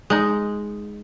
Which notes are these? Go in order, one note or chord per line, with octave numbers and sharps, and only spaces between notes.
G#3 D#4